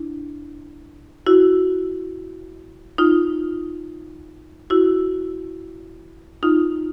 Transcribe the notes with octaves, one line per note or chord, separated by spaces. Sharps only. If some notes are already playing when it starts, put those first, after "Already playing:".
Already playing: D4 E4
E4 F#4
D#4 F4
E4 F#4
D#4 F4